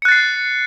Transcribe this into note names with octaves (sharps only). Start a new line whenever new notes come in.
F#6 A6 C7 C#7